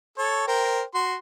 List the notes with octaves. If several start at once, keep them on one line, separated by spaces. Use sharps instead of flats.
A4 C#5
A#4 C5 G5
F#4 C6